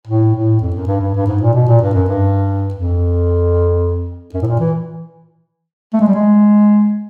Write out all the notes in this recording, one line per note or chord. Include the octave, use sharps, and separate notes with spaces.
A2
A2
F2
F#2
G2
G2
G2
G#2
A#2
B2
A#2
G2
F#2
G2
F2
F#2
A2
A#2
E3
A3
G#3
G3
G#3